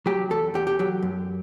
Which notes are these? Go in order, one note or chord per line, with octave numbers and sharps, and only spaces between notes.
F#3 G4
E2 A4
E2 G4
G4
F#3 G4
F#2